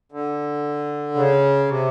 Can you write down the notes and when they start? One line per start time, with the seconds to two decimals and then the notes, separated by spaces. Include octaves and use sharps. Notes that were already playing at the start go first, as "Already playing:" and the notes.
0.12 D3
1.15 C#3
1.68 C3